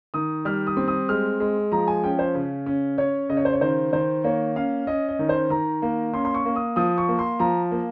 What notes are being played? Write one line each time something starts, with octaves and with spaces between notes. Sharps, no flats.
D#3 D#6
G3 F6
D#6
C4
D#6
G#3 F6
G#3
F3 A#5
G#5
C#4 G5
C5
C#3
C#4
C#4 C#5
C#3 D#5
C#5
C5
C#5
D#3 C5
D#3 C5
A#3 C#5
C#4 F5
C#4 D#5
D#5
D#3
C5
D#3 A#5
A#3
C#4 C6
C6
C#6
A#3
D#6
F3 D#6
C#6
A#3
C6
F3 A#5
A#3